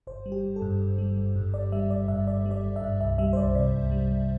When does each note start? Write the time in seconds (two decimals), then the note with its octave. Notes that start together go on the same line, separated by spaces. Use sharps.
0.07 G1 C5
0.26 G3
0.32 G4
0.43 G1
0.56 A4
0.62 G2
0.80 G1
0.98 G3
1.17 G1
1.36 G2
1.54 G1 D5
1.72 G3 E5
1.90 G1 D5
2.08 G2 E5
2.27 G1 D5
2.46 G3
2.51 D5
2.64 G1
2.76 E5
2.82 G2
3.01 C2 E5
3.18 G3 E5
3.33 C5
3.36 C2 D5
3.55 C3 D5
3.74 C2
3.91 G3
4.10 C2